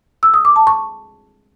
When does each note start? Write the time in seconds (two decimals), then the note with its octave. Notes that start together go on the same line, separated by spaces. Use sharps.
0.23 E6
0.34 D#6
0.45 D6
0.56 A5
0.67 C#6